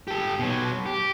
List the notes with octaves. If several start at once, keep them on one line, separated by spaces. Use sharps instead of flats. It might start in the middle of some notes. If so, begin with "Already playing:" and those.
G4 A4
B2 F#3
G4